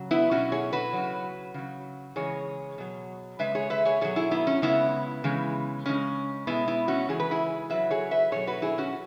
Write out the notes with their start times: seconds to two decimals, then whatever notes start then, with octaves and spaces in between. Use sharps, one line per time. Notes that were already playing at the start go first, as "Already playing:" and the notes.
Already playing: C#3 F#3
0.11 B3 E4
0.31 B2 F#3 C#4 F#4
0.52 G#4 C#5
0.73 F#4 B4
0.93 C#3 F#3
1.54 C#3 F#3
2.16 C#3 E3 G#3 G#4 C#5
2.78 B2 F#3
3.39 C#3 G#3 B4 E5
3.55 G#4 C#5
3.70 B4 E5
3.85 G#4 C#5
4.01 B2 F#3 G#4 C#5
4.16 E4 G#4
4.31 B3 E4
4.47 C#4
4.62 C#3 G#3 B3 E4
5.24 C#3 E3 G#3
5.86 C#3 G#3 C#4
6.47 B2 G#3 B3 E4
6.68 B3 E4
6.88 C#4 F#4
7.09 C#3 E3 G#3 G#4
7.20 B4
7.31 E4 G#4
7.70 C#3 F#3 B4 E5
7.90 G#4 C#5
8.11 B4 E5
8.32 B2 F#3 G#4 C#5
8.47 F#4 B4
8.62 E4 G#4
8.78 C#4 F#4